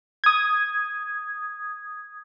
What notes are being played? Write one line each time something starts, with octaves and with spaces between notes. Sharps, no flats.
D#6 G#6